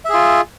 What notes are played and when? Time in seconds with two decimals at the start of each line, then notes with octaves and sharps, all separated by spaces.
0.05 E5
0.09 G#4
0.14 F4